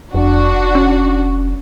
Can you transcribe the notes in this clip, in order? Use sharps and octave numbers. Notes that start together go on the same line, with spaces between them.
F1 F2 D4 F#4
C#4